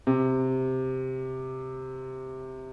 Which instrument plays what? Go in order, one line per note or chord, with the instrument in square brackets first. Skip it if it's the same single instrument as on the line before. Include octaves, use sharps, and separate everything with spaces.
[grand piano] C3